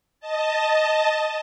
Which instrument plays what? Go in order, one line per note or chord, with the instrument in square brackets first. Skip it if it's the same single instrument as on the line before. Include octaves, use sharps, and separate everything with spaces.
[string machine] D#5 A5